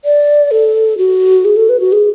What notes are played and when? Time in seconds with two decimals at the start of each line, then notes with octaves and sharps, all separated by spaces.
0.05 D5
0.51 A4
0.98 F#4
1.45 G#4
1.57 A4
1.69 B4
1.80 F#4
1.92 G#4